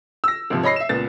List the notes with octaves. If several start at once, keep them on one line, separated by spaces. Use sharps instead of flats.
E6 A#6
G#1 C3 F3
C#5 D#5 B5 A#6 C7
E5 E7
C#2 A#2 B3 A6